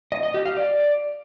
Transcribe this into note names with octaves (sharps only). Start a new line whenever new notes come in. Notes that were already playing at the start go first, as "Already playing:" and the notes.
D#5
D#5
G4
F5
D5